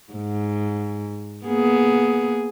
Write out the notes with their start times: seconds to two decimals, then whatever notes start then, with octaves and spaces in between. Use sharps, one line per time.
0.13 G#2
1.45 A#3 B3 G#4